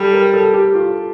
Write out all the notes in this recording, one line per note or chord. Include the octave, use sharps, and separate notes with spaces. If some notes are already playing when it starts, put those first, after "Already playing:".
Already playing: G3 A4
A#4
A4
G4
F4